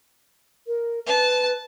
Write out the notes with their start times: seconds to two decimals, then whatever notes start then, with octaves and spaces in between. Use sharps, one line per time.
0.67 A#4
1.06 B4 A5